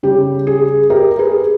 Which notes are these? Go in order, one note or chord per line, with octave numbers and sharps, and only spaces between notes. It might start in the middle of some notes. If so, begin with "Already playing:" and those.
C#3 G3 G4
G#4
G4 A#4
G#4 B4